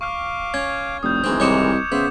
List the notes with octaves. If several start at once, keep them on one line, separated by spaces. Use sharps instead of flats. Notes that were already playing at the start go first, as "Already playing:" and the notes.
F5 C#6 D6 F6
C#4 G#6
F1 A2 G3 D#6 G6
D1 D#3 E3 G#3 C4 E4
C2 C4 D#4 C#5 D6 C#7 E7
C#3 B3 C5 E5